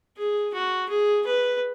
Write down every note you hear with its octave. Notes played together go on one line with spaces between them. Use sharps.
G#4
F#4
G#4
B4